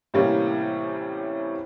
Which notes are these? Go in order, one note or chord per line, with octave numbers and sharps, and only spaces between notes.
A2 C3 E3 G3 A#3 C#4